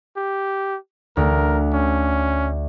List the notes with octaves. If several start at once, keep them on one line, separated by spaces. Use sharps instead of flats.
G4
D2 A#4
C#4